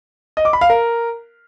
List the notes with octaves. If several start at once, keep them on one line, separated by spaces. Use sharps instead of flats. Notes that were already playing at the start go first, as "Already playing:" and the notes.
D#5
D6
B5
F5
A#4